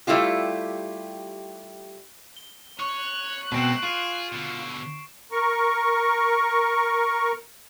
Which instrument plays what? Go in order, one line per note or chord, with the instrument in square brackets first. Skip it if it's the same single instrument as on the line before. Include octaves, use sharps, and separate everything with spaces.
[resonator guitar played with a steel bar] G3 A3 E4 F4 G4
[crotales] G7
[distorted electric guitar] C#5 [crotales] C#6 [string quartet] F#6
[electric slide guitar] B2 C4 [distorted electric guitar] G#3 A3 [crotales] C7 D7 E7
[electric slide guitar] F4 [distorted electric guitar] G#4
[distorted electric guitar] B2 D3
[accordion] A#4 C#6